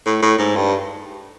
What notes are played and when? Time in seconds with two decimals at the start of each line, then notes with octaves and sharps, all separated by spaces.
0.06 A2
0.22 A2
0.39 G#2
0.56 G2